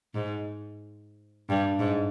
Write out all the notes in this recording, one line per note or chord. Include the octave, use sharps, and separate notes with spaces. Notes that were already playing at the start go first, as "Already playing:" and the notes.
G#2
G2
G#2